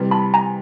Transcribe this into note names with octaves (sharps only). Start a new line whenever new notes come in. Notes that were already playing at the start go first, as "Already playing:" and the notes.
Already playing: C3 E3 G3
A5 B5
G#5 A#5